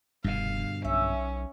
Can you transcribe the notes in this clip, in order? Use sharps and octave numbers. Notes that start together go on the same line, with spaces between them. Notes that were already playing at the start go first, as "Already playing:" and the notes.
F1 G2 B2 D3 F5
B1 C#4 E5